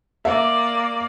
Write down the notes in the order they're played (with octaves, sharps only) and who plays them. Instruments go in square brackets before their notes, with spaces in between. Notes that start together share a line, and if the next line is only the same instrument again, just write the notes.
[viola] A#3 D5 [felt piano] E5